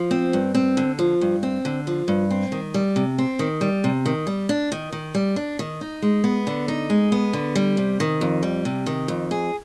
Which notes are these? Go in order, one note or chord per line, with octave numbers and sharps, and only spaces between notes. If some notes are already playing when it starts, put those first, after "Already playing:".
Already playing: F3
C4
G2
C4
D3
F3
G2
C4
D3
F3
G2
C4
D#3
G3
C3
C4
D#3
G3
C3
D#3
G3
D4
D#3
D#3
G3
D4
D#3
D#4
G#3
B3
D3
D#4
G#3
B3
D3
G3
C3
D#3
F2
G3
C3
D#3
F2
G#4